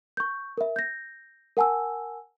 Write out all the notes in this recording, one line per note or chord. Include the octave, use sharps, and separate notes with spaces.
C#6 G6
A#4 E5
G6 A#6
A#4 F#5 G#5 A5 E6